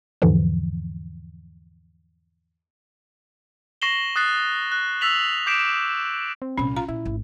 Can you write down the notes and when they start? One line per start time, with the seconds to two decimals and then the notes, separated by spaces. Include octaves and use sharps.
0.22 E2 G#2 D3 E3 F3
3.82 C#6 A#6 C7 E7 F#7 G7
4.16 D#6 F#6 A6 C7
4.72 F#6
5.01 E6 A6 B6 F7 F#7
5.47 D6 G6 B6 C7 D7 E7
6.42 C4
6.58 C2 A#2 C#4
6.77 F4 A#5
6.88 A#2 E4
7.05 G#1